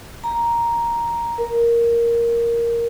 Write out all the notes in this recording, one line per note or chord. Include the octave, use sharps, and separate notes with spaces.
A#5
A#4